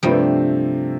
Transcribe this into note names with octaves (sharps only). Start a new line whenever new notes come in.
G2 C3 F3 G3 A3 C4